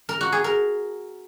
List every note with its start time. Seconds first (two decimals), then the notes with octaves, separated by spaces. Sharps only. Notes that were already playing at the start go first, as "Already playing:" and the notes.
0.09 A#4
0.21 F#4
0.32 G#4
0.44 A#4